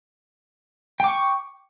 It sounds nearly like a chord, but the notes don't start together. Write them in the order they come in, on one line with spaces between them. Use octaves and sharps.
G5 D6 C#6